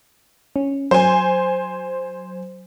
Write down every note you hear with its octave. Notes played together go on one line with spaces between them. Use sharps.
C#4
F#3 C5 G#5